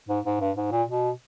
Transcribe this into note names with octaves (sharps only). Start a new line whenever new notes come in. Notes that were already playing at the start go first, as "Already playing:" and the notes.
G#2
G#2
G2
G#2
A#2
B2